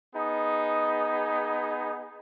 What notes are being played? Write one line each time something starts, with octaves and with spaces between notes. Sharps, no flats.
B3 D#4 G#4